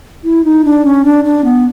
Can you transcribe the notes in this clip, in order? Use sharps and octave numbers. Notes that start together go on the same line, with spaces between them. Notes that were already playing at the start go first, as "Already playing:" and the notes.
E4
D#4
D4
C#4
D4
D4
B3